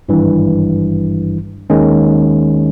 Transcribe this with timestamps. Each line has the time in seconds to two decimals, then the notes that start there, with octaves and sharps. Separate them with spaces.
0.09 G#1 G2 E3
1.70 D#2 D#3 G#3 C#4